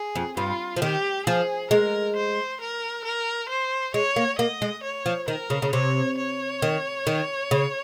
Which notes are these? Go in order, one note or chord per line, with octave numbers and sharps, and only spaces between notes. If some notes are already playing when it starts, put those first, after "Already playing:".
Already playing: G#4
F2
G2 F4
F3
D#3 G4
F3 G#4
G#3 A#4
C5
A#4
A#4
C5
G#3 C#5
A#3
A#3 D#5
G#3
C#5
F3
D#3 A#4
C#3
C#3
C3 C#5
C#5
D#3
D#3
C#3